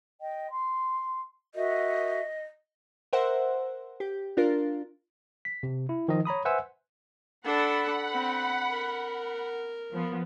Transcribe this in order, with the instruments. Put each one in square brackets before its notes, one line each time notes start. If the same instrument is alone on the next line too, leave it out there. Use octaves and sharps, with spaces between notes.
[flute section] D#5 G5
C6
[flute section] F#4 A#4 E5 [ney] D#5
[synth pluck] A#4 C5 E5 F#5
G4
D4 F4 A#4
[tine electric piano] B6
C3
E4
D#3 F3 D#4 D#5
C#5 A#5 B5 D#6
B4 C5 E5 F#5 G#5 E6
[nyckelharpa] D4 A4 [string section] F#5 B5
[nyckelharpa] C4
A#4
[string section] F3 B3